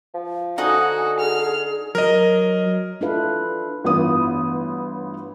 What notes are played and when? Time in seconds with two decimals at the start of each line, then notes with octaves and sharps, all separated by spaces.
0.14 F3
0.58 D3 D#4 F#4 F#5 G#5 D#6
1.20 G#4 F6
1.95 F#3 A#4 D#5
3.01 D4 E4 F4 A4 B4 F5
3.84 A1 G2 B3 F4 B4 D#6